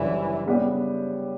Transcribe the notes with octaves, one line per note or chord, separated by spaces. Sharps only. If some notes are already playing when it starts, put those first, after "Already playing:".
Already playing: F#1 F#2 D3 E3 G3 D4
C#3 G3 B3 D4 G4